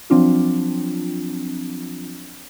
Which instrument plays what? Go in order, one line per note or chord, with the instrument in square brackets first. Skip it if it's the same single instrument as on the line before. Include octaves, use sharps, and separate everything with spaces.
[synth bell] F3 F#3 C4 D4 F4